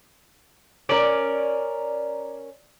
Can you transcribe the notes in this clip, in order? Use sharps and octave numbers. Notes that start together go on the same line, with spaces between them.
C#4 A#4 D5